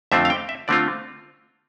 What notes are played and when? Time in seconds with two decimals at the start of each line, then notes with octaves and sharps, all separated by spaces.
0.12 F2 D3 A3 C4 F4 E5
0.25 F5
0.30 G5
0.49 E5
0.68 D3 A3 C4 F4 D5